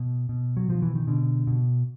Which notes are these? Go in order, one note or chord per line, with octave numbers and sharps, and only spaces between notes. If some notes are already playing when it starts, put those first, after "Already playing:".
Already playing: B2
B2
F#3
B2 F3
E3
D#3
B2 D3
B2